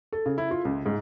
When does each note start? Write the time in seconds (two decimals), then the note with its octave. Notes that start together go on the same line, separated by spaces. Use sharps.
0.13 A4
0.26 C#3
0.38 E4
0.51 F4
0.65 C#2
0.86 G#2